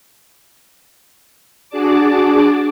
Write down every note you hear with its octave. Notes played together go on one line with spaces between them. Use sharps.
D4 F#4 G#4 D5 A5 D6